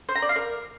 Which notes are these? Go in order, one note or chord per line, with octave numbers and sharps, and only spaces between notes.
C5
A#5
D5
F5
A#4